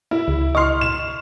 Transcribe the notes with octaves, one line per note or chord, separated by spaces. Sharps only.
E4
C#2
D#5 C6 C#6 F6
E7